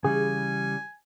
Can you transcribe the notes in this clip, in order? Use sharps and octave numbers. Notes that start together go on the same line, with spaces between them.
C#3 E3 G3 G#4 G#5